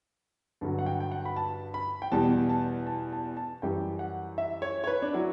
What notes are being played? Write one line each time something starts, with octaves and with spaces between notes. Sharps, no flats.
G2 D3 F#3 A5
F#5
G5
G5
F#5
B5
A5
B5
G5
E2 B2 G3 A5
A5
A5
A5
A5
F#2 E3 G3 G5
F#5
E5
C#5
C#5
B4
D4
F#3 E4